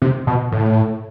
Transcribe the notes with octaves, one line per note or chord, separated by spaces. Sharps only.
C3
B2
A2